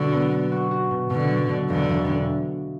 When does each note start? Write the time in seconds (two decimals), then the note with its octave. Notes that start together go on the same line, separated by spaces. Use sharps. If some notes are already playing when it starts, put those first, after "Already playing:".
Already playing: B2 D3 F#3 F#4
0.13 B3
0.32 B3
0.52 F#4
0.71 F#4
0.91 B2
1.10 B2 D3
1.30 F#3
1.50 B2
1.69 E1 D3
1.89 E1